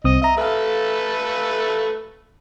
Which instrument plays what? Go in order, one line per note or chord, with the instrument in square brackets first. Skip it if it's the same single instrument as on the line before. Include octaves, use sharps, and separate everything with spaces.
[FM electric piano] C2 C4 D#6 [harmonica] D#5
[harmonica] D#5 [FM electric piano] E5 A#5
[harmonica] A3 A4 B4 [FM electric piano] E5 F5